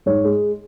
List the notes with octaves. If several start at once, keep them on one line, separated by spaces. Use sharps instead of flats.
G#2 C#5
G#3